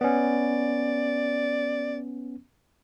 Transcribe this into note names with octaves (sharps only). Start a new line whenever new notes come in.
B3 C#4 D5